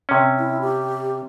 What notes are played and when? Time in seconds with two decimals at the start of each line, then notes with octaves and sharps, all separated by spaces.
0.09 C3 C#4
0.39 E4
0.61 G4